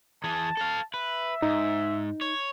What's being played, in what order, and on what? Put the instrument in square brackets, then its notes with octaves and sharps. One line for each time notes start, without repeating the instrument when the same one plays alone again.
[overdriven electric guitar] E3 G#4 [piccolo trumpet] A5
[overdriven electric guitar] A4 F5
[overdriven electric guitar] B4 [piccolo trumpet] E5
[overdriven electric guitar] G#2 [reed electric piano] D#4
[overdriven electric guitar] C#5